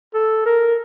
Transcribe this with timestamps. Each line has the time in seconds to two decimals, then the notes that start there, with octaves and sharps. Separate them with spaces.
0.14 A4
0.46 A#4